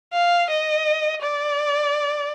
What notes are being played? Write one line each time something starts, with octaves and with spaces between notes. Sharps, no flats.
F5
D#5
D5